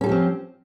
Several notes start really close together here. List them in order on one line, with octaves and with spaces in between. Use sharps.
C#4 A4 G4 F3 C4